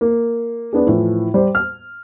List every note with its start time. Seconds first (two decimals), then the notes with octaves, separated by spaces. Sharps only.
0.01 A#3
0.73 B3 D4 G#4
0.87 A2 E3 F3
1.34 G3 C5
1.55 F6